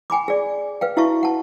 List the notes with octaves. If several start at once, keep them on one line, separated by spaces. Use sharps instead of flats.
G5 G#5 B5 D6
G#4 D5
B4 F5 G5
E4 F#4 E5 F5 A5 C#6
F#5 A5